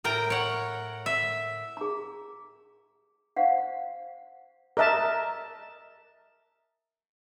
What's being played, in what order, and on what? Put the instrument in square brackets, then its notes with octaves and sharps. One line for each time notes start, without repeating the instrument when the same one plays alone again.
[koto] A2 A#4 G5 A#5
C#5 F#5
E5
[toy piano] G#4 A#5
C5 F5 F#5
[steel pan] A#4 D#5 E5 A5